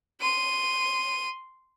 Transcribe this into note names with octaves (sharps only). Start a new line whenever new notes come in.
C6 D#7